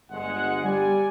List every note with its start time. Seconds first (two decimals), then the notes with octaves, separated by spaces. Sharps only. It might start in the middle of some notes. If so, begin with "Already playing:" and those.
0.11 G1 G#3 F#5
0.64 G3 D5 G#5